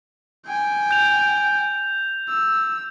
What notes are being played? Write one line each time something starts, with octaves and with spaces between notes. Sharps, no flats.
G5 G#5
G6 F7
E6